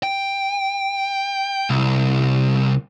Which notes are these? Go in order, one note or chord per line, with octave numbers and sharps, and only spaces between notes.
G5
C2